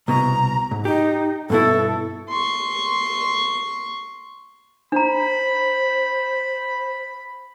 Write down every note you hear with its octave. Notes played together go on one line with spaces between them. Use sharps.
C2 B2 A#5
G#2
D#4 G4
G2 B2 E4 A4
C6 C#6
D4 C5 A#5 B5